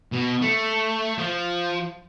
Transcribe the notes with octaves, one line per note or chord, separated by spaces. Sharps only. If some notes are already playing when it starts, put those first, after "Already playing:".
B2
A3
F3